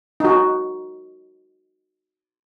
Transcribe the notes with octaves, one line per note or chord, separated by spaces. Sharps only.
D#4 F#4